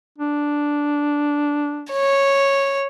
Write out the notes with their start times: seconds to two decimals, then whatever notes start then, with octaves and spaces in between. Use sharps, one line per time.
0.18 D4
1.92 C#5